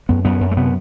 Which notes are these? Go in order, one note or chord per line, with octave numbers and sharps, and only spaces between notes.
F#2 B3
F#2 B3
F#2
A3
C3 B3